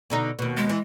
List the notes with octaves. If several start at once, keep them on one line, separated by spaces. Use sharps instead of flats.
B2 D3 D#4
D#2 B2
G#3
E3